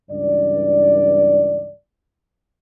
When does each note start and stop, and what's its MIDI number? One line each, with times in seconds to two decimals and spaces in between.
0.10 1.73 37
0.10 1.73 43
0.10 1.73 52
0.10 1.73 74